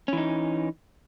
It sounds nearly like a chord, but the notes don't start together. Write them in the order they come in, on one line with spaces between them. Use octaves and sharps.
C#4 E3 D#4